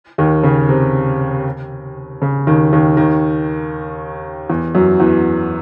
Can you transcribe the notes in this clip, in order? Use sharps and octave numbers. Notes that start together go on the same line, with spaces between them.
D#2 D#3
C#3
C3
C#3
D#2 D#3
D#2 D#3
D#2 D#3
E2 E3
F#2 F#3
E2 E3